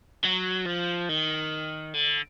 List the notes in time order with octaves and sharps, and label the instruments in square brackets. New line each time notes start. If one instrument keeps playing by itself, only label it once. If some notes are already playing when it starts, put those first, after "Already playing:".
[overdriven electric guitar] F#3
F3
D#3
D3